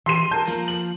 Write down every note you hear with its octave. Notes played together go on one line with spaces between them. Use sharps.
E3 G4 C6 C7 D#7
A#4 A5 G6
F3 A#3
F#7